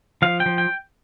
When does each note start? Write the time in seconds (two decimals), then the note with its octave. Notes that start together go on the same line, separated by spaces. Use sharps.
0.22 F3 F5
0.40 G5
0.46 F3
0.58 G5